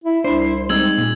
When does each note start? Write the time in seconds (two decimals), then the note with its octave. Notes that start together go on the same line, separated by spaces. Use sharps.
0.04 E4
0.24 C2 D4 E4 C5
0.69 G3 G#3 C4 D#4 E6 G#6 F#7
0.98 A#2